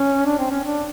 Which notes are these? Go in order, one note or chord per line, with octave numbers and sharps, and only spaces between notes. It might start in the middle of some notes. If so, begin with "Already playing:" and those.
Already playing: C#4
D4
C4
C#4
D4